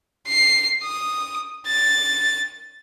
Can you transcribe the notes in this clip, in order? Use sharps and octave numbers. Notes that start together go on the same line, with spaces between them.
C7
D#6
A6